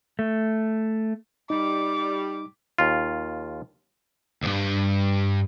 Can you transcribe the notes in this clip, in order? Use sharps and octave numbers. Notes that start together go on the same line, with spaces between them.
A3
G3 D#4 D6
D#2 F4
D2 G2